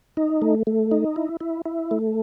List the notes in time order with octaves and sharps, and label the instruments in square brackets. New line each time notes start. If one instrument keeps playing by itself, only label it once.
[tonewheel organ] D#4
A3
A3
D#4
E4
E4
E4
A3